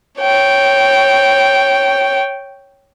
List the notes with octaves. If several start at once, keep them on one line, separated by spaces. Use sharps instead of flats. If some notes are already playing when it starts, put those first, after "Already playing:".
C#5 G5